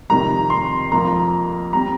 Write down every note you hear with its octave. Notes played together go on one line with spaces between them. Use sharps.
F2 C3 D#3 G3 A#5
C6
F2 F3 A#3 A#5
G3 C4 A#5